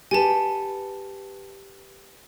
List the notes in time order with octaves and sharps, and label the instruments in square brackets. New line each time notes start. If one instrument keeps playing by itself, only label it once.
[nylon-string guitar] G4 A4 B4 [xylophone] G#5 A5